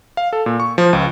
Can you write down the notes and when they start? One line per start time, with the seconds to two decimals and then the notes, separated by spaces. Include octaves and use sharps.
0.17 F5
0.33 A4
0.46 A#2
0.60 C#6
0.78 F3
0.93 C#2